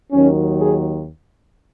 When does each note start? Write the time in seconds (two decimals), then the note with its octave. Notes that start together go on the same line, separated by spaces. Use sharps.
0.11 D#2 D#3 F#3 C#4
0.59 G#4